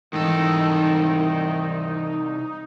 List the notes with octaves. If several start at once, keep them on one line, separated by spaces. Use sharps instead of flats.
C2 G#2 D#3 E3 D#4 A4